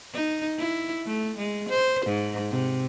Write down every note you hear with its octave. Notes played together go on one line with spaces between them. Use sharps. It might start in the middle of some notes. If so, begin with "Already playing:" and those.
D#4
E4
A3
G#3
C5
G#2
C3